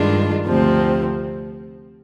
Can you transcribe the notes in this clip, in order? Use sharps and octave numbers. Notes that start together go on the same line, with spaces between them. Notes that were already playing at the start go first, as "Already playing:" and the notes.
Already playing: G2 D#3 G#3 D4 F4
D2 C3 F3 C4